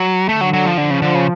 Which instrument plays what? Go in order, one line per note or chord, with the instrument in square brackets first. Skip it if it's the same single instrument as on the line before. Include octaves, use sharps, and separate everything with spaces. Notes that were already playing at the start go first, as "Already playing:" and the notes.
Already playing: [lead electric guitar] F#3
[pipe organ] D3 [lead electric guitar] A3
[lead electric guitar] F#3
F#3
F3
[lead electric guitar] D3 [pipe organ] F3
[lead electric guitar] C#3
D3
C#3